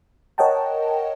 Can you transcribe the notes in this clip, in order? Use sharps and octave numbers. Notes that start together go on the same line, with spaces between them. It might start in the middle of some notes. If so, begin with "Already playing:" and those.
A#4 C#5 D#5 F#5 G5 A5